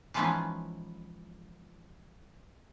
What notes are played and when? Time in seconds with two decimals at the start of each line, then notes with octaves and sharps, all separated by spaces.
0.14 E3 F3 G#3 B3 C#4 D#4